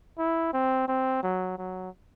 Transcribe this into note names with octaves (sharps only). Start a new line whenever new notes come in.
E4
C4
C4
F#3
F#3